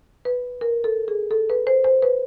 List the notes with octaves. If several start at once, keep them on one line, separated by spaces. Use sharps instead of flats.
B4
A#4
A4
G#4
A4
B4
C5
C5
B4